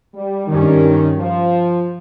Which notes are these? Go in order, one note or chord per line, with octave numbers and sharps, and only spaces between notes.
G3
G2 D#3 G3 C#4
F3